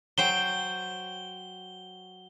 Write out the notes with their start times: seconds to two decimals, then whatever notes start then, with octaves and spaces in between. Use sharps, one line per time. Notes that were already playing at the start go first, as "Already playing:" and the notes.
0.18 F#3 C5 G5 G7